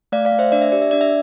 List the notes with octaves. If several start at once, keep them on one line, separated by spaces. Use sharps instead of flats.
A3 D5 F5
D5 F5
A3
C5 E5
D4 D5
E5
G4 D5
E5
D4 D5
E5